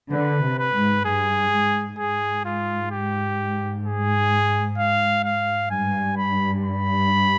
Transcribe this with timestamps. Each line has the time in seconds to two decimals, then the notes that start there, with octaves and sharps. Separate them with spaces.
0.12 D3 B4
0.44 C3
0.59 B4
0.74 G#2
1.05 G2 G#4
1.52 G#2
1.99 G#2 G#4
2.45 F4
2.91 G4
3.85 G#4
4.78 F5
5.24 F5
5.71 G2 G#5
6.17 B5
6.64 B5